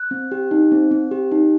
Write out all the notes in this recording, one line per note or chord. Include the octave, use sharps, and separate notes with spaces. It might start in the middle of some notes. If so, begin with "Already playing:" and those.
Already playing: F#6
C4
G4
D#4
C4
C4
G4
D#4